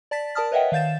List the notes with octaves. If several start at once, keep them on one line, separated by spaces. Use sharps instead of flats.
D5 A5 A6 B6
A#4 D5 A5 D#6 F6
B4 C#5 D#5 E5 F#5 G5
D#3 F5 G6 A6 E7